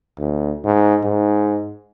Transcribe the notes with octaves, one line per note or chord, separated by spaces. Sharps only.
D2
G#2
G#2